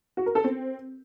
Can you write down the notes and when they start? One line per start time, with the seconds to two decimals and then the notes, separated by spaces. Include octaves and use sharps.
0.17 F#4
0.26 A#4
0.35 A4
0.44 C4